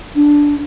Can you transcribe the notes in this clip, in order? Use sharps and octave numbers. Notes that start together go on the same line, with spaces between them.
D4